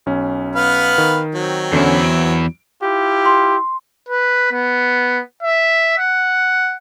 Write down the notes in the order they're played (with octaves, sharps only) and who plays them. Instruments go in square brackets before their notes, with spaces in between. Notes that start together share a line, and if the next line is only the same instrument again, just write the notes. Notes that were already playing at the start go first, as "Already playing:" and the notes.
[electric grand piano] B1 C#4
[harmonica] B3 B4 F5
[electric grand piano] D#3
[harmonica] F#3 C4
[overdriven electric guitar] E2 E4 [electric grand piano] D3 C#4
[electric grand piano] D7
[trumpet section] E4 F4 G4
[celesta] C6
[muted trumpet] B4
B3
E5
F#5